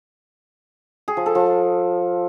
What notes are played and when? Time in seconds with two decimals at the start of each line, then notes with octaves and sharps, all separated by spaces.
1.08 G#4
1.17 F3
1.26 A4
1.35 F3